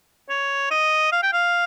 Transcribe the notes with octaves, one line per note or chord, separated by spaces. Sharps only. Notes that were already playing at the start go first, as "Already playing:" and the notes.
C#5
D#5
F5
G5
F5